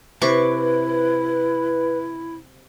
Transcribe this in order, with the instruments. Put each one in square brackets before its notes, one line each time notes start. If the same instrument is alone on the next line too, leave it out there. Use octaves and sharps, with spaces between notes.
[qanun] C3 C#6 D6 [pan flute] E4 [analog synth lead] B4